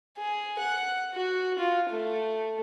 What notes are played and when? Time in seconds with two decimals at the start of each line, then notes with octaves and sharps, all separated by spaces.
0.17 G#4
0.59 F#5
1.14 F#4
1.59 F4
1.90 A3